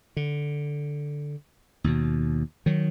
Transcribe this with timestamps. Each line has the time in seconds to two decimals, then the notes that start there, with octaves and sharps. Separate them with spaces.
0.17 D3
1.84 D#2 B2
2.66 D#3 F#3